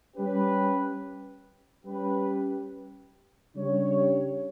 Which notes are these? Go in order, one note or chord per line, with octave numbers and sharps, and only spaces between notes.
G3 C#4 G4 B4
G3 C#4 G4 B4
C#3 G3 D4 G4 C#5